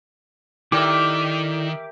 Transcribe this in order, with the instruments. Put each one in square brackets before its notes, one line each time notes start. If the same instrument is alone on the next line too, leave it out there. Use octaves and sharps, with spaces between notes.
[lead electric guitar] D#3 [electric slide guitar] E4 A4 D5 [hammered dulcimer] G4 A#4 E5 [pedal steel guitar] D6